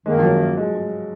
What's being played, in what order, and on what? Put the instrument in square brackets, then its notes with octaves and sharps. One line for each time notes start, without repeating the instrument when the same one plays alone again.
[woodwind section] F#2 D#3 A#3 [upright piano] G#3
[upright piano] F3
F#3
G#3
G#3